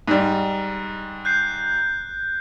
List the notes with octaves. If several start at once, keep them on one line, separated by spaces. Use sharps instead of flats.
G#2 G3
F#6 G6 C7